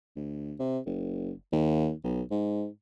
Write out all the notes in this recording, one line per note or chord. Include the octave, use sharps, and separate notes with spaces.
D2
C3
F#1
D#2
B1
G#2